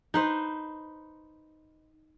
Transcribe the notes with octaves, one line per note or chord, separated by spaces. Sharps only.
D#4 B4 C5